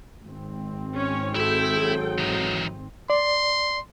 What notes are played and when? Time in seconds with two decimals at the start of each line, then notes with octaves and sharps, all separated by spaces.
0.23 G#1 C4
0.95 C#4 C#5
1.35 E4 F#4 G#4 A4 E5 G5
1.80 F#3
2.18 E3 D#4
3.10 D5 C6